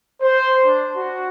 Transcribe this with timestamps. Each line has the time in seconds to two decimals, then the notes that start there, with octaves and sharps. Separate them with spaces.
0.22 C5
0.66 D4
0.97 F#4